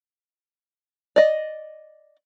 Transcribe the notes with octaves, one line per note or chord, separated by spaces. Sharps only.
D5 D#5